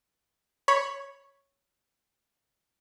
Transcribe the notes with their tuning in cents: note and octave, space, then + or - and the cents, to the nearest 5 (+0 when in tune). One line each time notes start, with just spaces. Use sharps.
C#5 +0 B5 +0